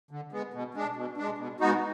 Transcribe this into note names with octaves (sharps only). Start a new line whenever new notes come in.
D3
G#3 B3
B2
G#3 D4
B2
G#3 D4
B2
G#3 B3 D#4 F#4